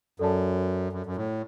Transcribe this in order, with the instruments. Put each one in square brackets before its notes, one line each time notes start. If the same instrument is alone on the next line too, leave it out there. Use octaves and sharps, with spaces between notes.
[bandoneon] F#2 [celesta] A4 D5 A5
[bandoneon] F#2
F#2
A2